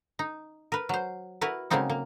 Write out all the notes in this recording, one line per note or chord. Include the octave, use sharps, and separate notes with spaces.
D#4
A#4 B4
F#3 C5
E4 F#4 A#4 B4
C#3 F#3 G#3 A#3 C4 D#4
A#3